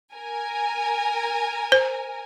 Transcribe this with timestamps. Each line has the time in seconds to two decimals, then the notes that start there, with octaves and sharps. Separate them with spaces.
0.14 A#4 G#5
1.72 C5